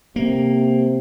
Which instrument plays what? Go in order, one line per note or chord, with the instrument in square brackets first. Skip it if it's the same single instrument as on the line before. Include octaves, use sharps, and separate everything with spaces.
[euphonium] C3 [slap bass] A#3